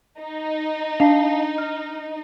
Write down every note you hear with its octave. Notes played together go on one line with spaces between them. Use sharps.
D#4
D4 F5 A5 C7
F6